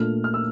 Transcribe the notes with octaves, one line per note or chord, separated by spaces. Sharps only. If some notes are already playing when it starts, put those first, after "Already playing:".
Already playing: A#2 A3 D4 F6
F6
E6